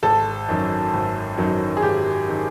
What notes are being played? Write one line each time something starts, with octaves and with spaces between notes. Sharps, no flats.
G#1 A4
F#2 D#3 F#3
G#1
F#2 D#3 F#3
G#4
G#1 G4
D#3 F#3